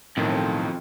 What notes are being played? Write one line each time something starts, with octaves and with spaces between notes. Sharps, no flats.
B1 F2 A2 D#3